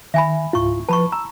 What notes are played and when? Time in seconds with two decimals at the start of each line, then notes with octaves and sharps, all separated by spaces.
0.14 D#3 E5 G#5 B5
0.53 C#2 G#2 E4 F4 C#6
0.89 F3 B4 A5 B5 C#6
1.12 A#5 E6